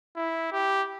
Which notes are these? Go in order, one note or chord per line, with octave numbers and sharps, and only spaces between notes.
E4
G4